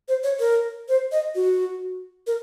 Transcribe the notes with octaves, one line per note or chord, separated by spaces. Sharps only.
C5
C#5
A#4
C5
D#5
F#4
A#4